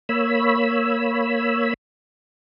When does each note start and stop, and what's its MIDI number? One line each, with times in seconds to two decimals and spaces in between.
0.09 1.74 58
0.09 1.74 73
0.09 1.74 83
0.09 1.74 88